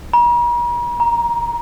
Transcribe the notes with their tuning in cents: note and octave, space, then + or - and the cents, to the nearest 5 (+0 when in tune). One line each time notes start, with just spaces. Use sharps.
A#5 +45
A#5 +15